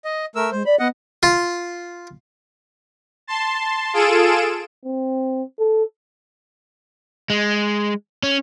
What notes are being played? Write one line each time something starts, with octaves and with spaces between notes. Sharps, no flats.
D#5
A3 A#4 E6
G#3 C5
D5 B5
B3 D#5 F#5
F4
A5 C6
F4 G#4 A4 D7 E7
C4
A4
G#3
C#4